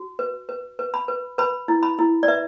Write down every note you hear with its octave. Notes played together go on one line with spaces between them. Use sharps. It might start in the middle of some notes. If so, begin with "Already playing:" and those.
Already playing: F#4
B4
B4
B4
B5
B4
B4 B5
E4
B5
E4
D5
B4 E5